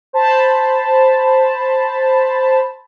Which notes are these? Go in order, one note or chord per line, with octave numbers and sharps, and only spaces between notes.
C5 A5 B5